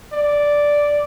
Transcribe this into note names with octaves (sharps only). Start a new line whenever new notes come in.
D5